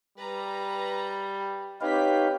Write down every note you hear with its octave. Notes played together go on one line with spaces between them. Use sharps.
G3 B4 A#5
C4 D#4 G4 B4 C#5 F5 G5 B6